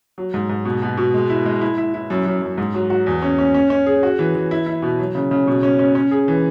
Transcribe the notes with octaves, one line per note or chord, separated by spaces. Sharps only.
F#3
G#2
G#2
B2
B2
B2
G#3
E4
G#3
E4
E4
E4
F#2
F#2
F#2
G#2
F#3
F#4
E2
C#4
C#4
C#4
C#4
G#4
F#4
E3
E3
E4
E4
B2
F#3
C#3
C#3
B2
C#4
C#4
C#4
G#4
E3